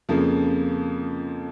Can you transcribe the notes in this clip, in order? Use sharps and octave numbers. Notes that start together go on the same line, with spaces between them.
F2 C#3 F3 A#3